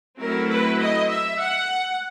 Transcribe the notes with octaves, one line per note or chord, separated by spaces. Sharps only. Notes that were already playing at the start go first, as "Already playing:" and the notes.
F#3 A3 C4 E4 A#4
B4
D#5
E5
F#5